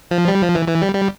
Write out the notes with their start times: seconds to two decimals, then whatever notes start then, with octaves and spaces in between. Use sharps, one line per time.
0.11 F3
0.28 G3
0.42 F3
0.55 E3
0.68 E3
0.82 G3
0.94 G3